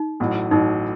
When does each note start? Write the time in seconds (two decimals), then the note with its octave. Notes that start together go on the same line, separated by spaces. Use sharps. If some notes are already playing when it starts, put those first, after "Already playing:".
Already playing: D#4
0.20 A1 A2 F#3
0.51 A1 A2 F#3 D#4